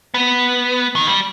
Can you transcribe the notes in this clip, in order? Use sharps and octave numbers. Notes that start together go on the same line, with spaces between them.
B3
D#3
G3